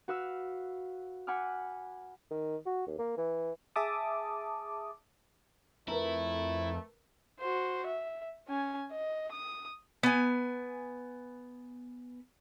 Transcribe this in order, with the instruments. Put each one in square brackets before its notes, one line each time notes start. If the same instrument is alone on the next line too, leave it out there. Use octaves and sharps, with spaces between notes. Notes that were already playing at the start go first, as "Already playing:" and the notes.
[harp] F#4 B4 F5 E6
F#5 G#5 B5 D6 F6
[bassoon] D#3
F#4
D#2
A#3
E3
[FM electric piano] G#4 E5 A5 D6 D#6
[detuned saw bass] F2 [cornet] A3 [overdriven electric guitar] E4 [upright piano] A#4 B4 A#5
[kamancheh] F#4 C5
E5
C#4 G#5
D#5
D#6
[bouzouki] B3 G#5